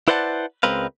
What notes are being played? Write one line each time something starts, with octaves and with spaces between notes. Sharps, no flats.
E4 B4 C5 D5 F#5 A5
C#2 G#3 C4 A#4 B4 F5